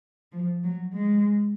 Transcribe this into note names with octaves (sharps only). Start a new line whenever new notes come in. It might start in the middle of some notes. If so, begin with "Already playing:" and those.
F3
F#3
G#3